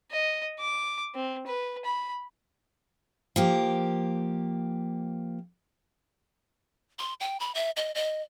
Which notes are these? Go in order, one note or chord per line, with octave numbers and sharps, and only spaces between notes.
D#5
D6
C4
B4
B5
F3 A#3 G4
C6
G5
B5
E5
D#5
D#5